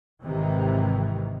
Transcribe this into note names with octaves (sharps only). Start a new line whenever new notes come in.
G#1 G#2 C3 D#3 E3